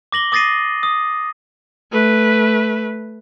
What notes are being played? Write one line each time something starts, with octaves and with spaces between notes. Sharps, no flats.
D6 A#6 F#7 G7
D6 D#6 A6 A#6 C7 D#7
D#6
A3 B4